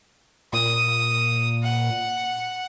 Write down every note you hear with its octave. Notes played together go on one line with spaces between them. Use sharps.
A#2 D#6
F#5